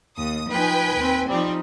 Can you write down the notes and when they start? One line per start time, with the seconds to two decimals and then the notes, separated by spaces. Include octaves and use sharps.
0.16 D#2 D#6
0.51 F3 D#4 B4 G5 G#5
0.96 D#2 C4
1.29 F3 G3 C4 D#4